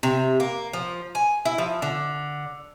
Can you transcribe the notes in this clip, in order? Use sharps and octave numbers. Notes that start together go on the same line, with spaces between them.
C3
A#3
F3
G#5
E4
F3
D3